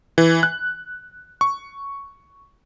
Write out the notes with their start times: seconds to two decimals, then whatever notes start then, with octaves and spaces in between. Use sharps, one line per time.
0.18 E3
0.43 F#6
1.41 C#6